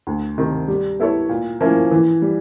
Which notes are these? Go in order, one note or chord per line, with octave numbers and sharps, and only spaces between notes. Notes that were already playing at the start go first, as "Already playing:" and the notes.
D2
C3 D#3
G3
B3 E4 A4 C#5
A#2
F3 A#3 C#4 E4
E3
G3